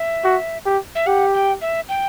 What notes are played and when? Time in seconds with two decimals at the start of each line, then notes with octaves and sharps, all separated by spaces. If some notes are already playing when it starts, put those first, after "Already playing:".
Already playing: E5
0.24 F#4
0.66 G4
0.95 E5
1.07 G4 F#5
1.34 G5
1.61 E5
1.89 G5